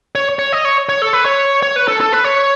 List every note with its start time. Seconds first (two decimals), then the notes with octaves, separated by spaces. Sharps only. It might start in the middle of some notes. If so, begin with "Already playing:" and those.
0.15 C#5
0.39 C#5
0.52 D#5
0.65 C#5
0.89 C#5
1.02 A4
1.13 B4
1.25 C#5
1.63 C#5
1.76 B4
1.88 A4
2.01 A4
2.13 B4
2.24 C#5